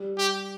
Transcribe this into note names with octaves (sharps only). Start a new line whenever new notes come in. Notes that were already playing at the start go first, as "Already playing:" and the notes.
Already playing: G3
G4